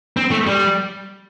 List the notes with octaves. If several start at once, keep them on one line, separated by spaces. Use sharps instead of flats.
C4
A3
G3